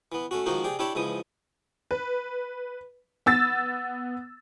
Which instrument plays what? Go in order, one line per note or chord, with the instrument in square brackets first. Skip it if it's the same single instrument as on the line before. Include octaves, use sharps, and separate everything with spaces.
[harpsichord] E3 B3
A3 C#4 F#4
G#2 D#3 F3 A#3 D#4 F#4
C3 G#4 D5 G5
D4 E4 G4 C#5 D5 A5
C#2 G#2 E3 F3 D#6
[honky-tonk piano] B4
B3 E6 A6